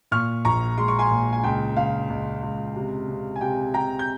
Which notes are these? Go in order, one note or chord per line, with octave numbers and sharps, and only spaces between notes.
A#2 C#6 F6
A#1 A#5 C#6
G#3 C6
C#6
G#5 C6
A#2
G#5
C#2 G5
C#2 F5
C#2
C#2
C3
C3
G#5
C3 G5
C3 G5 A#5
G6